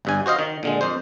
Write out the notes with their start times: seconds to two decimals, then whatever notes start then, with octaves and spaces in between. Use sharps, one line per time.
0.05 G1 G2 G#5
0.26 F#4 C5 D#5 F5
0.39 D#3
0.63 A#2 D3 G#3
0.81 F2 C5